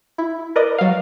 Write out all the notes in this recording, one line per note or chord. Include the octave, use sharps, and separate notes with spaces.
E4
A#4 B4 D5 D#5
F#3 F5